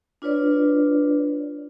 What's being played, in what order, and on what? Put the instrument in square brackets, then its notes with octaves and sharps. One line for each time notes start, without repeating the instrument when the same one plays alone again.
[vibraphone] D4 F4 B4 C#5 D5